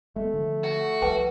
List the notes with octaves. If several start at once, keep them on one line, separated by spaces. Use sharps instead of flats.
G#3 A3 B3
D3 F3
F#4
C2 F3 B4 G5 A5